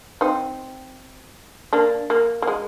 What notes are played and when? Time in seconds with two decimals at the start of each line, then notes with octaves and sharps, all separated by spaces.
0.21 C4 D#4
1.73 A#3 D4
2.10 A#3
2.42 A#3
2.47 G#3